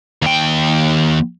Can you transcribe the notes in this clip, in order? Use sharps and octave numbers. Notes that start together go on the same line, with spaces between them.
D#2 G5